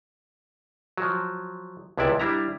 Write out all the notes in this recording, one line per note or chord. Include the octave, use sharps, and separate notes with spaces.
F3 F#3
C#2 C3 G#3 E4 D5 E5
G3 D4 E4 A#5